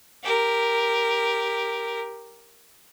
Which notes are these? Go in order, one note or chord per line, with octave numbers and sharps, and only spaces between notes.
G4 A#4